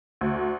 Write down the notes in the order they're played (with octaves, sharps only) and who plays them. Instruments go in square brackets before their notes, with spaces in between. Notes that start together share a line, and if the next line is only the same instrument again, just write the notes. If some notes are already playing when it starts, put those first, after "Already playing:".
[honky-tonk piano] D2